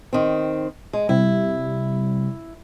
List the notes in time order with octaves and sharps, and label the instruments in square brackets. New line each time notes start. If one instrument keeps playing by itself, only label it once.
[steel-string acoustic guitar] D#3 C4
G#3
[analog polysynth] C3 G3 [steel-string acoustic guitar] E4